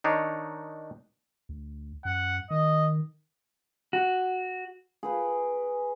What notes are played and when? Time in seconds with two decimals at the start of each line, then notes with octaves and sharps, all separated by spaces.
0.04 D#3 D4 D#4 C#5
1.49 D2
2.05 F#2 F#5
2.50 D#3 D#5
3.93 F#4
5.03 G#4 B4 G5